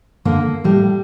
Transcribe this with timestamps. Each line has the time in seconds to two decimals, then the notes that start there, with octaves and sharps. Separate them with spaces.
0.25 D3 A#3
0.64 A2 G3